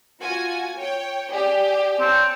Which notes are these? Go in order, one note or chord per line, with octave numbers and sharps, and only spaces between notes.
F4 F#4 G#5
C#5 G5
G4 G#4 D5 G#5
C4 C#5 A5